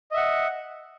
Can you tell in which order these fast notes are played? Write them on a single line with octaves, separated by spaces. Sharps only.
D#5 E5 F#5